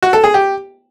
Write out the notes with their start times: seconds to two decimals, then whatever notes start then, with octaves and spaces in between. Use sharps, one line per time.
0.02 F#4
0.13 A4
0.24 G#4
0.34 G4